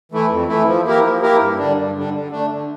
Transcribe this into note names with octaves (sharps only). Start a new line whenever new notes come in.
E3 A3 E4
F2
E3 A3 E4
F3
A#3 E4 G4 A#4
F3
A#3 E4 G4 A#4
G2
D3 G3 D4
G2
D3 G3 D4
D3
A3 D4
D3